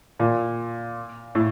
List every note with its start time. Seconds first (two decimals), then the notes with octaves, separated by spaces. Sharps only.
0.20 A#2
1.35 A2